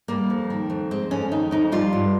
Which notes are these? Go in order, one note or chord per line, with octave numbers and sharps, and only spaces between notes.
G3 A#3
F2
D#3
F2
G#3 C4
F2 C#4
D#3 D#4
F2 D#4
G3 F4
G2